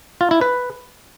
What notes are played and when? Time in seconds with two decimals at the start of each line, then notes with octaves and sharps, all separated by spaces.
0.21 F4
0.31 E4
0.41 B4